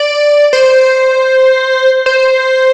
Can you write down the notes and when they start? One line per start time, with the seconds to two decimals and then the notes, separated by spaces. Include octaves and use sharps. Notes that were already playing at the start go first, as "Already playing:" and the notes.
Already playing: D5
0.53 C5
2.06 C5